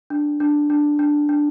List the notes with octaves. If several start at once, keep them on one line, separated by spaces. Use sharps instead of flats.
D4
D4
D4
D4
D4